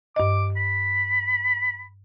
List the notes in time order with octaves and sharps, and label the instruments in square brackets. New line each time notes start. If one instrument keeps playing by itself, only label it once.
[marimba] G2 D#5 [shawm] D6
[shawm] B5